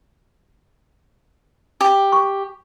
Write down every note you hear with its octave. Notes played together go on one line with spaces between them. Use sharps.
G4
C#6